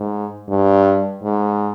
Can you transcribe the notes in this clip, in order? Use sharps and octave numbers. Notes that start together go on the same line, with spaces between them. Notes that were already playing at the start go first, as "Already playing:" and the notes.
Already playing: G#2
G2
G#2